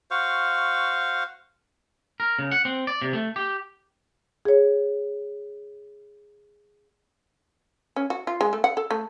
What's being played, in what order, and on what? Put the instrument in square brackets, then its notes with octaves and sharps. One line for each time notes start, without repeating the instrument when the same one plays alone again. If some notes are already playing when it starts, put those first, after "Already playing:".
[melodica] F#4 C5 F5 C#6
[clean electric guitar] A#4
C#3
F#5
C4
D5
C3
A3
G4
[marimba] G#4 C#5
[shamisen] C#4
F#4
F4
G#3
A3
F#5
A4
A3